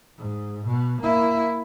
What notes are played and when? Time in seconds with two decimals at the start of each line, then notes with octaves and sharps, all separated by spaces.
0.17 G#2
0.66 B2
1.02 A#3 E4